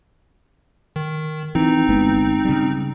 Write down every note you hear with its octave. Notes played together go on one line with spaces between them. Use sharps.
D#3
E3 C4 D#4
G1 G#3 B3
C#3 G3